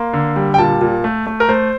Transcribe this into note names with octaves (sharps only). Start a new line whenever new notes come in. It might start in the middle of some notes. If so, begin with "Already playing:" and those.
Already playing: A#3 C6
D3
G3
G5
A#2 A5
A#2
A3
A3
A#4
A3 C5